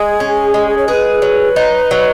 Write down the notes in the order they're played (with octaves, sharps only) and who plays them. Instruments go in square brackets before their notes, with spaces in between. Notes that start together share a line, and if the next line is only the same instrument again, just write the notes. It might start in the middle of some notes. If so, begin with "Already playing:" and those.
Already playing: [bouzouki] G#3 [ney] G#4
[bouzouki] C#4
G#3
[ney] C#5
[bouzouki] G#4 [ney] B4
[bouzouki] F#3
D#4
F#3